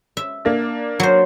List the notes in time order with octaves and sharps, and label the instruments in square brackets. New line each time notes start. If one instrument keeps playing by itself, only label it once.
[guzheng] E5
[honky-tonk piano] A#3 D4
[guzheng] F#3 C5